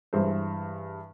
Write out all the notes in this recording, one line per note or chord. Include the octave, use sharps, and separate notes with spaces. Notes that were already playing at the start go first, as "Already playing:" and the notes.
G2 E3 G#3 C5